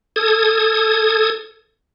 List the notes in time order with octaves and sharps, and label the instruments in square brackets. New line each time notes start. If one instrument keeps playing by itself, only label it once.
[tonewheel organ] A4 D#6 G#6